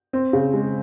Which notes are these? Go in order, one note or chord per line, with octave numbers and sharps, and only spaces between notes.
C4
C#3
G#3